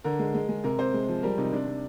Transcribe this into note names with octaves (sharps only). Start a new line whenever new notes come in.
D3 A#4
G#3
G#3
G#3
C3 A#4
C3 C5
G#3
F3
G3 A#4
C3 D#4
C3 D4
C3